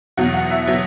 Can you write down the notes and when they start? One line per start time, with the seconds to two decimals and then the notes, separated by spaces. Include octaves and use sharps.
0.17 E2 B2 F#3 F#5
0.34 F#5
0.51 E5
0.67 B2 F#3 E5